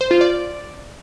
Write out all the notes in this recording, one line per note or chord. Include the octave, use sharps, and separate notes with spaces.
C5
F4
D5